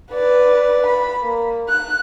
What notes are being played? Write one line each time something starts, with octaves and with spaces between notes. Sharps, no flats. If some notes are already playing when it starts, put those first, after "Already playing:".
B4 D5
B5
A#3
F#6